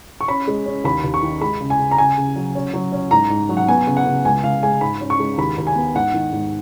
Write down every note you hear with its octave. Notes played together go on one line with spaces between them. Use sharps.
C#6
C#4 B5
G#3
C#4
D#2 B5
D#2
C#6
D#3
G#3 B5
C#3
G#5
C#3
A#5
C#3 G#5
C#3
F#3
C#4
F#3
C#4
G#2 A#5
G#2
F#3
F#5
B3 G#5
C#3
F#5
C#3
C#2 G#5
C#2 F5
G#3 G#5
G#2 B5
C#4
C#6
G#3
D#2 B5
D#2
G#5
B3
G#2 F#5
D#3
G#2